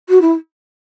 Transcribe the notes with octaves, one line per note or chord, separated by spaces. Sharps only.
F#4
E4